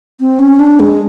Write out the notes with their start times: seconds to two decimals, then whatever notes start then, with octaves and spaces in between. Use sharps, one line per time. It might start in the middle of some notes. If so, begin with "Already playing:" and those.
0.20 C4
0.39 C#4
0.59 D4
0.80 G#3